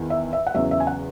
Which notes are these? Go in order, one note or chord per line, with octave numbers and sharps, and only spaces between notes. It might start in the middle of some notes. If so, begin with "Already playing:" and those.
Already playing: E2 D#3
E5
E5
F#5
E2 C#3 F#3 E5
E5
G#5
F#5